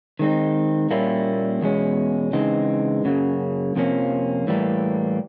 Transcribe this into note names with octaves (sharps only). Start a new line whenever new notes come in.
D#3 G#3 C4 D#4
A#2 G3 A#3 C#4 E4
E2 B2 G#3 C#4
C#3 E3 G#3 C4 D#4
F#2 C#3 F#3 A#3
F2 C3 F3 A#3 C#4
A2 E3 G3 A#3